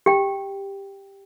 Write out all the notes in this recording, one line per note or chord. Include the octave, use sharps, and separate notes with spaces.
G4 G5